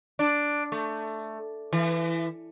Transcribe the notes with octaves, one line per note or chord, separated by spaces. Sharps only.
D4
A3
E3